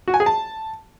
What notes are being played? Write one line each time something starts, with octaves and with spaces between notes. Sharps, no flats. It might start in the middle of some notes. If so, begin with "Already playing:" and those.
F#4
G#5
G#4
A5